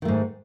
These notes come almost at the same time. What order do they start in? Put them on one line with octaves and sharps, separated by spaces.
D#3 A3 G#2